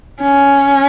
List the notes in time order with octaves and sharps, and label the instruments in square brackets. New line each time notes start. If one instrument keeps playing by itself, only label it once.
[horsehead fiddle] C#4